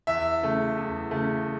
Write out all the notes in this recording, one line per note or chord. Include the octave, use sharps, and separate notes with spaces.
E2 E5
C#3 A3
E2
C#3 A3